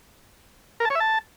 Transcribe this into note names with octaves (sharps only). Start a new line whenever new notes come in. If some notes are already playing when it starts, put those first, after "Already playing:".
A#4
A5
C#5
E5
A5